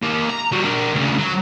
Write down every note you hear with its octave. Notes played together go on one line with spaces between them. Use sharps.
A#3 G4
A#5
G3 F#4
D4 A#4
D2 C#3
F#3